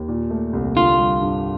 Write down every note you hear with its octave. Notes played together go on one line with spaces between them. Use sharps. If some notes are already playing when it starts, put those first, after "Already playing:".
Already playing: D#2
A#2
A3
C2
D3 F4
G3
G2